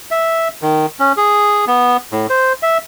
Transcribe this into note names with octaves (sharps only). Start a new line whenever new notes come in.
E5
D#3
C#4
G#4
B3
A2
C5
E5